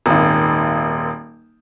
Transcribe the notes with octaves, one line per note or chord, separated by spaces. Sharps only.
D#1 G#1